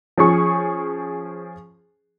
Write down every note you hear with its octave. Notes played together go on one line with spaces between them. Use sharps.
F3 C#4 G#4 C#6